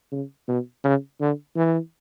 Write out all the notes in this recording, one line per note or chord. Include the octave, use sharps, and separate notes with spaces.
C#3
B2
C#3
D3
E3